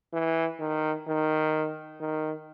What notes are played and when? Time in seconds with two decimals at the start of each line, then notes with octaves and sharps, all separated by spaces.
0.13 E3
0.60 D#3
1.07 D#3
2.00 D#3